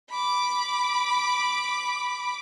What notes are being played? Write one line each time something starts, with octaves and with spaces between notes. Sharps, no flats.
B5 D6